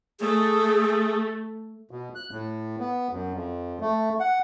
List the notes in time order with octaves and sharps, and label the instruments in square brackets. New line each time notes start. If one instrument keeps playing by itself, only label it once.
[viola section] A3 [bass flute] G#4
[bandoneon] B2
F#6
A2
B3
F#2
F2
A3
F#5